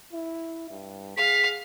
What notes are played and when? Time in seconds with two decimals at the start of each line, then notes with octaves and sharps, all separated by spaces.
0.12 E4
0.70 G2
1.17 G#4 F5 B6